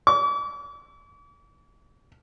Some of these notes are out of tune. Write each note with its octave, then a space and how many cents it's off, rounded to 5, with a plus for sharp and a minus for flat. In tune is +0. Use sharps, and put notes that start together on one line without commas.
D6 -45